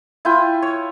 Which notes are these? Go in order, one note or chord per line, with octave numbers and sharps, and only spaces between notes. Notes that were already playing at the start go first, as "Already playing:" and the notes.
E4 F4 G5 G#5
C#5